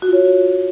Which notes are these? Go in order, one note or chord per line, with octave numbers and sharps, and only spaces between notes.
F#4
F4
C#5